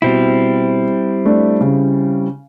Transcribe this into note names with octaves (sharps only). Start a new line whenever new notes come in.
B2 G3 C4 E4
A3 D4
C#3